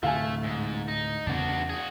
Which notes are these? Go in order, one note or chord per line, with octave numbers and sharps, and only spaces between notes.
D2 A2 C3 A3 F5 G#5
G#2
D#4
E2 C#3 B3 D4 F#4
F#4 G#4